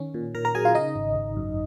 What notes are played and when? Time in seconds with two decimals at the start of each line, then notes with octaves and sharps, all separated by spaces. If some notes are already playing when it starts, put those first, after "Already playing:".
Already playing: D#3 C#4
0.14 A#2
0.34 A#2 A#4 A#5
0.45 A#4 A#5
0.55 F#3 G#4 G#5
0.65 F4 F5
0.75 C#3 D#4 D#5
0.96 G#1
1.16 G#1
1.37 F#2